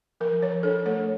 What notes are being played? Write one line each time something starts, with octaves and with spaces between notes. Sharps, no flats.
F3 A#4
F3 C#5
D4 A4
A3 C#5